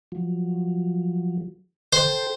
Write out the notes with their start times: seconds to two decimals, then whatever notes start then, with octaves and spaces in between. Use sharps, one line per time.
0.12 F3 F#3
1.93 A4 C5 G5 C6